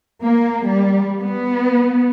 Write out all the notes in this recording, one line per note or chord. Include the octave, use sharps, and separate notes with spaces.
A#3
G3
B3